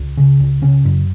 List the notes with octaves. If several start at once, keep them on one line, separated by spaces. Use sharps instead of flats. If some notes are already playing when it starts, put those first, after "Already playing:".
Already playing: C#2
C#3
C#2
C#3 C#4
F#2